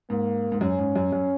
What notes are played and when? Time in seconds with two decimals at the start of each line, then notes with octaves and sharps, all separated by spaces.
0.10 G#2 A#3
0.52 G#2
0.61 F#2 C#4
0.79 G#2
0.96 F#2
1.12 F#2